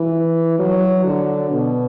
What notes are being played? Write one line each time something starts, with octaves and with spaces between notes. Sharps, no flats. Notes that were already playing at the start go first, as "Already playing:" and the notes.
Already playing: E3
F#3
D3
B2